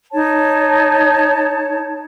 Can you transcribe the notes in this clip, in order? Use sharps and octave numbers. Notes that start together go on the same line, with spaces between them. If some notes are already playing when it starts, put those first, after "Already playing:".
D#4 C#5 A5